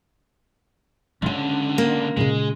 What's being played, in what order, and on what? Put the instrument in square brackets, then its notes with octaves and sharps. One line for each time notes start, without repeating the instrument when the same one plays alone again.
[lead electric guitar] C#2 D3 [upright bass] G#3 C#4
[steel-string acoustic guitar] A#3
[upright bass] A#2 C#3 [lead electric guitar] G#3